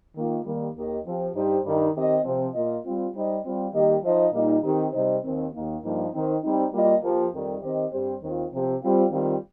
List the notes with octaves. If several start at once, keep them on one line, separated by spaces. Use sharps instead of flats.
D#3 A#3 F4
D#3 G3 A#3
D#2 D#3 A#3 G4 D#5
F3 C4 G4
G2 G3 D#4 G4 C5
G2 D#3 G3 D#4
D#3 C4 G4 D#5
C3 F3 C4
A#2 A#3 F4 D#5
G3 C4 F4
G3 D#4 C5 D#5
G3 C4 F4
D#3 G3 A#3 G4 D#5
F3 D#4 C5 D#5
A#2 G3 A#3 D#4
D#3 C4 D#4 G4
C3 G3 D#4 C5 D#5
D#2 D#3 C4
D#2 D#3 A#3
G2 F3 A#3 D#4
D#3 C4 D#4
G3 C4 D#4
G3 A#3 F4 D#5
F3 A#3 G4
F2 D#3 G3
D#3 C4 G4 C5 D#5
G2 G3 C4 G4 C5
D#2 D#3 C4 F4
C3 F3 C4 G4
G3 C4 F4
D#3 G3 C4 F4